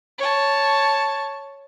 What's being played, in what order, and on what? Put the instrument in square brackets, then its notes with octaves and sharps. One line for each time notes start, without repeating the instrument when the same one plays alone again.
[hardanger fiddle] C#5 A5